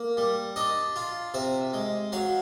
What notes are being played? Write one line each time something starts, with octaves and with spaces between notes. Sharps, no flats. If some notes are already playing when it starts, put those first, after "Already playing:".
Already playing: A#3
G3
D4 D#5
F4
C3 E5
G#3
F#3 F5